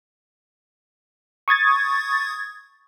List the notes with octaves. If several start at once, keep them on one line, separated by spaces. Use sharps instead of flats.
C#6 D#6 G#6 A6